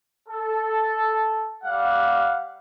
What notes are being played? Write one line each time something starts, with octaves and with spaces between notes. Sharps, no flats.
A4
G3 F5 F#5